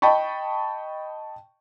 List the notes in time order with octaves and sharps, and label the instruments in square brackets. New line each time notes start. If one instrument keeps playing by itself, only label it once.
[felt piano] D#5 G5 A5 B5 C#6